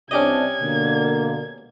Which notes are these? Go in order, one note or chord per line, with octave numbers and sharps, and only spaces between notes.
C2 C3 C#4 D4 G4 D#5 G#6
B2 D3 A#3